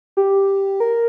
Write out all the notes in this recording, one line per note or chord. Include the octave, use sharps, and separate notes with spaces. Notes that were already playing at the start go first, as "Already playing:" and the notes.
G4
A#4